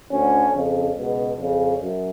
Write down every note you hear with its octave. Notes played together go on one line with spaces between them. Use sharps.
D2 D3 C#4
F2 C#3
C#2 B2
F2 C#3
F#2